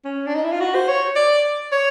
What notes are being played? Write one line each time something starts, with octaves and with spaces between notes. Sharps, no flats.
C#4
D4
D#4
E4
F4
F#4
C5
C#5
D5
C#5